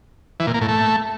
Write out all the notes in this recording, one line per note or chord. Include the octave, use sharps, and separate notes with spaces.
E3
A#2
A#3
A2
A3